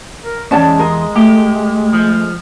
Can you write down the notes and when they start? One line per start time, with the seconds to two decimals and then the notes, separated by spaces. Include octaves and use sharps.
0.24 A#4
0.51 E2 G2 G#3 C#4 D5 A5
0.79 A#4 C6 D#6
1.16 A3 G4
1.93 F3